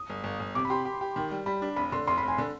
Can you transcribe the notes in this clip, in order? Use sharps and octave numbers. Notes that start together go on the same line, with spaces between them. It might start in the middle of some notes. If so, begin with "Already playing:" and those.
Already playing: D#6
G1
G1
G1
C3 D6
B5
G4 C6
G4
G4
D#3
G3
G3 B5
D4
F1 B5
D3 C6
F1 C6
B5
F1
G#5
D3